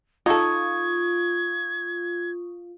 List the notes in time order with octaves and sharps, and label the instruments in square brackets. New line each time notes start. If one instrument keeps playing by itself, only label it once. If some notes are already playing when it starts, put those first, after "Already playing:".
[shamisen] D#4 A4 [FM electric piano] F4 [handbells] C#6 D#6 [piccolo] G#6